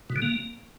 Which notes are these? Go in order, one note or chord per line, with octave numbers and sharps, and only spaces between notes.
B2
D3
A#3